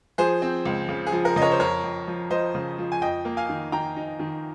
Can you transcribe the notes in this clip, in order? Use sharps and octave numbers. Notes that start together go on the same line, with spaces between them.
F3 G#4 C5
C4
C#2
C#3
G#4
F3
A#4
C#3 D#5
A#4 C#5
C5
F2 A#4 C#5
F2
F3
F3 C5 D#5
C#3
F3
G#5
F2 D#5 G5
A#3
F5 G#5
D#3
D#3 G5 A#5
D#4
D#3